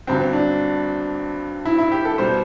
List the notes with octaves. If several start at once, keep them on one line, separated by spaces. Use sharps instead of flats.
G1 G2 D3 F#3 C4
D4
E4
E4
G4
A4
B2 G3 C5